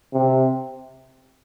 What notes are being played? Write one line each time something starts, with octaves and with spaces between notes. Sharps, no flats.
C3